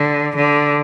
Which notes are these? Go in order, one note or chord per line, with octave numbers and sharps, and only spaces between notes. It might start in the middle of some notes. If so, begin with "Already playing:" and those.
Already playing: D3
D3